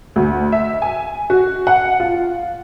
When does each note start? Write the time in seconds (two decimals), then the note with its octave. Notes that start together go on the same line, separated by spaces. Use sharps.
0.16 D2
0.52 E5
0.82 G#5
1.30 F#4
1.67 F#5
2.00 F4